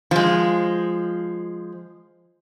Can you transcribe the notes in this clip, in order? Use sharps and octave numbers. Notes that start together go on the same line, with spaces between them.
F3 G#3